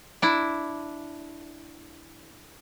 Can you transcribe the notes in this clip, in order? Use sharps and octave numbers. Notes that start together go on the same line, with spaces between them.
D4 E4